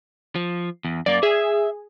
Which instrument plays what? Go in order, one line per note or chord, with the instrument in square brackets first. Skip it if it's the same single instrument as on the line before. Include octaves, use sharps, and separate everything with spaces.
[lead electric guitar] F3
E2
[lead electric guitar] F#2 A#3 [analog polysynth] D5
[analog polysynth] G#4 [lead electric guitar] E5